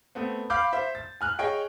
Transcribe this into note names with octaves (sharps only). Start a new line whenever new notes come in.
A3 B3 C4
F5 B5 D6 G6
C5 E5
A6
G#5 F6 F#6
G#4 C#5 D#5 G5